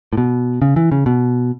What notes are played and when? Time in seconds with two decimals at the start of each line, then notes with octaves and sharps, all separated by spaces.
0.13 A2
0.18 B2
0.62 C#3
0.76 E3
0.92 C#3
1.06 B2